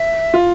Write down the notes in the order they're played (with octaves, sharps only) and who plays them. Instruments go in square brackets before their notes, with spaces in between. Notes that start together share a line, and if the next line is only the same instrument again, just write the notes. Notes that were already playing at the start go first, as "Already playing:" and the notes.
Already playing: [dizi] E5
[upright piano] F4